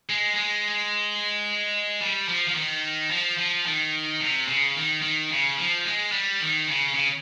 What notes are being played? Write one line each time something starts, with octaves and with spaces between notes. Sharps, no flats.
G#3
G#3
G3
F3
F3
D#3
F3
F3
D#3
C3
C#3
D#3
D#3
C#3
F3
G#3
G3
D#3
C#3
C#3